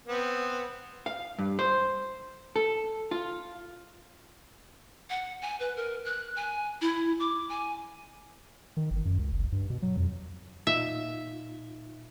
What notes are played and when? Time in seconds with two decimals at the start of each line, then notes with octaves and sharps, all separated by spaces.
0.07 B3 C4
1.06 F5
1.39 G2
1.59 C5
2.56 A4
3.11 F4
5.10 F#5
5.42 G#5
5.60 B4
5.76 A#4
6.05 F#6
6.36 G#5
6.81 E4
7.20 D6
7.49 G#5
8.77 D#3
8.91 G1
9.05 F#2
9.19 C#2
9.32 F#1
9.52 G2
9.70 B2
9.82 F#3
9.97 F2
10.67 A#2 D#4 F4 E5